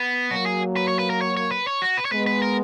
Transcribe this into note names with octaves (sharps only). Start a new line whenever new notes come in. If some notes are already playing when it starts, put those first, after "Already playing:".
Already playing: B3
F#3 A#3 F#4
G#4
B4
C#5
B4
A#4
C#5
C#5
B4
C#5
F#4
B4
C#5
G#3 B3 B4
B4
A#4